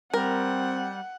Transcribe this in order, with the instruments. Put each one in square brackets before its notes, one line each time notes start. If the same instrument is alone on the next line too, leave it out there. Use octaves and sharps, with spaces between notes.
[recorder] G3 [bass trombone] C4 [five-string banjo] A#4 [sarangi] F#5